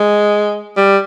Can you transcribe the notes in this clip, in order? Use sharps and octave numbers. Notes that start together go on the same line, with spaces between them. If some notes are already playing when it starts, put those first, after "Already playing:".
Already playing: G#3
G3